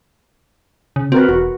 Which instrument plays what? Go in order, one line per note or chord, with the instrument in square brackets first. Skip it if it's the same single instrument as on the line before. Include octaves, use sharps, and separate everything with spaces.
[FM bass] C#3
[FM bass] C4 [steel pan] F#4 A#4 B4
[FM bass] E1 [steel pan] F#4